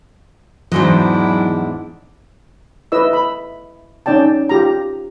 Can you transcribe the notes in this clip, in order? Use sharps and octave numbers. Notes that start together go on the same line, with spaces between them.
E2 G#2 F#3 D4 E4 D#5
E4 B4 D#5 E6
B5
C#4 D#4 D5 G5 A5
F4 G4 A#5